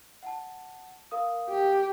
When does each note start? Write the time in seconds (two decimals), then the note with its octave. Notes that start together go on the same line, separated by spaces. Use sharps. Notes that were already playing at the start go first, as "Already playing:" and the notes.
0.23 F#5 A5
1.11 A#4 F5 D#6
1.50 G4